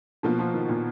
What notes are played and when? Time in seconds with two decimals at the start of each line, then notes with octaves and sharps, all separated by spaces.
0.23 B2 F3 A#3 F4
0.39 F3
0.54 D#3
0.69 A#2